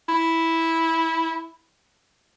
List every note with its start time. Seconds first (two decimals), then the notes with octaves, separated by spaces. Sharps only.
0.09 E4